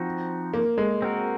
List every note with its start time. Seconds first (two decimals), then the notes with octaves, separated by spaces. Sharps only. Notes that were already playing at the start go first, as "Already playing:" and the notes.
Already playing: F3 C4 D#4 F#4
0.53 A#3
0.78 G#3
1.02 C4 F#4 A#4